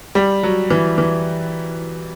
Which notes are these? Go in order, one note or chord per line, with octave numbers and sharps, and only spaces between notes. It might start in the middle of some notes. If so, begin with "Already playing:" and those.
G3
F#3
E3
E3